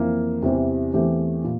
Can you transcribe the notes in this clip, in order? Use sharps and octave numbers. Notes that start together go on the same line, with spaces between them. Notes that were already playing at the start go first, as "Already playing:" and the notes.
Already playing: F2 E3 A#3
E2 C3 E3 G3 C4
E2 E3 A3 C4 G4
A#2